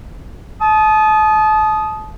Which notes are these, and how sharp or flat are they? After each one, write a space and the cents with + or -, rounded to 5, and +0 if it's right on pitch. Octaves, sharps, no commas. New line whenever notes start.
A5 -30 D#6 +0